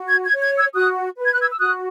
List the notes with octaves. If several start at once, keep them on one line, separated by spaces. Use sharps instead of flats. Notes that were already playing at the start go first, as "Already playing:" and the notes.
Already playing: F#4
G#6
G#6
C#5
G#6
E6 G#6
F#4 D#6 F#6
B4
G#6
F#6
E6 G#6
E6
F#4 D#6 F#6